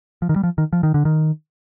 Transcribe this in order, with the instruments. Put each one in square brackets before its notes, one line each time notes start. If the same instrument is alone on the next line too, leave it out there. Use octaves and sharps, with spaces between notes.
[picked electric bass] F3
D#3
G3
F3
D#3
F3
D#3
D3
D#3